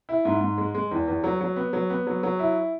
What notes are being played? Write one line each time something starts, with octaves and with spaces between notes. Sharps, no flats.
E4
G#2
G#2
G#3
G#3
E2
E2
F#3
F#3
B3
F#3
B3
F#3
F#3
E4